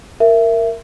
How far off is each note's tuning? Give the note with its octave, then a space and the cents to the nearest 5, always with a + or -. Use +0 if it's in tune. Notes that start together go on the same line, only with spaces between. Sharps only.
A#4 -10 E5 +15